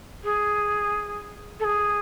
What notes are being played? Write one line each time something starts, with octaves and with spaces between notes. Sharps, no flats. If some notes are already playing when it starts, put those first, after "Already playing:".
G#4
A4
G#4